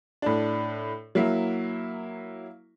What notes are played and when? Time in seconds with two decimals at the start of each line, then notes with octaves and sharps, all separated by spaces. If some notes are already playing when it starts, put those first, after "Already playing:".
0.22 A2 D4
1.15 F#3 A#3 E4